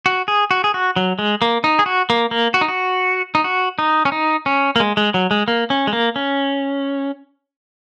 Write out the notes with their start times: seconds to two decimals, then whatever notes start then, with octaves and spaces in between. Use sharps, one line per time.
0.06 F#4
0.28 G#4
0.51 F#4
0.64 G#4
0.74 F#4
0.96 F#3
1.19 G#3
1.42 A#3
1.64 D#4
1.79 G#4
1.86 F#4
2.10 A#3
2.31 A#3
2.54 F#4
2.61 D#4
2.68 F#4
3.35 D#4
3.44 F#4
3.79 D#4
4.05 C#4
4.12 D#4
4.46 C#4
4.76 A#3
4.80 G#3
4.97 G#3
5.14 F#3
5.31 G#3
5.48 A#3
5.70 C#4
5.87 G#3
5.93 A#3
6.16 C#4